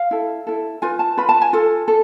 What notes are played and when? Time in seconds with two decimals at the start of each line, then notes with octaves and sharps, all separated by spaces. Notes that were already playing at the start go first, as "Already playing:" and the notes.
Already playing: F5
0.11 E4 A4
0.47 E4 A4
0.82 F4 B4 G#5
0.99 A5
1.17 F4 B4 B5
1.29 A5
1.42 G#5
1.53 F4 A4
1.88 A4